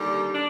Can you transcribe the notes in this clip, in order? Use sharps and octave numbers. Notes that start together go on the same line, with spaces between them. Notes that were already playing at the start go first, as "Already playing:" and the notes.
Already playing: D#2 D3 G3
D4